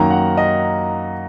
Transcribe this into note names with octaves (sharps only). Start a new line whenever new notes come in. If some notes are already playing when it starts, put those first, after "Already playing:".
Already playing: F#2 D#3 A#3 A#5
F#5
D#5